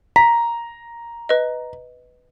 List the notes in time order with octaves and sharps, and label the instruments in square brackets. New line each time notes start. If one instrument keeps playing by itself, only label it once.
[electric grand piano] A#5 [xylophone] B6
[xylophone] B4 D#5